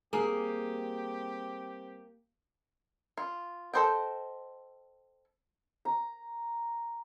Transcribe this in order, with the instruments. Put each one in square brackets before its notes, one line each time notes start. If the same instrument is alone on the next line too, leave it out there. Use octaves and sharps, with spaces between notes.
[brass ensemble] G3 C4 G4 [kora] A#3 [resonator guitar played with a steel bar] G#4
[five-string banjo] F4
A4 B4 C5 D#5 G5
[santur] A#5